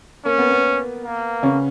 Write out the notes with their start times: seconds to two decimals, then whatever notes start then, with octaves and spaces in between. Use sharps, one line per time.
0.25 A#3 C#4
0.38 B3
0.51 B3
1.04 A#3
1.43 C#3 C#4